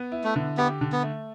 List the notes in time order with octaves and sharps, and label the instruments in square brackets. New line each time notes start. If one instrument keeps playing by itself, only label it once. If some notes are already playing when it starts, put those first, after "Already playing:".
Already playing: [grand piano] B3
E4
[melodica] A3
[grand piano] D3
[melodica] B3 [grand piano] G4
[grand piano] D3
[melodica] B3
[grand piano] A3